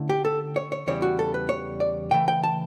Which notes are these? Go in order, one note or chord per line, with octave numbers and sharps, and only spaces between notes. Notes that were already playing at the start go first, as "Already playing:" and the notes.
Already playing: D3 A3 C#4 E4
G4
A4
C#5
C#5
E2 C#3 E3 G3 C#5
F#4
A4
B4
C#5
D5
C#3 E3 A3 G5
G5
A5